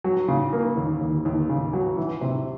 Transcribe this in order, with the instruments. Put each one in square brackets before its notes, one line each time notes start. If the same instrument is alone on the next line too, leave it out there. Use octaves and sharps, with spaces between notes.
[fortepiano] F#3
C#3
A#3
D#2
D#2
D#2
C#3
F#3
E3
C3